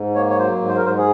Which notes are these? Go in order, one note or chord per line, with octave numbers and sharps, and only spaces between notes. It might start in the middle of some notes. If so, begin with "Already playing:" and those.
Already playing: G#2
A#3 C#5
C#5
F#3 C5
G#2
C5
A#4
G#2 C5
G#4